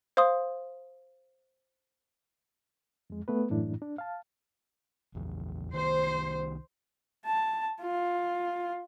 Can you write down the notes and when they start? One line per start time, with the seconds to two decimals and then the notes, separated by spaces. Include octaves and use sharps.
0.17 C5 F5 C6 D#6
3.10 F2 G#3
3.28 A3 B3 B4
3.50 F#2 A2 E3 D4 E4
3.82 D4
3.98 F5 A5
5.14 A#1 E2
5.73 C2 D#3 C5
7.26 A5
7.82 F4